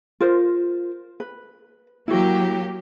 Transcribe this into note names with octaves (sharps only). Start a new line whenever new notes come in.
F4 A#4 C5
B4
F#3 A#3 E4 F#4 G4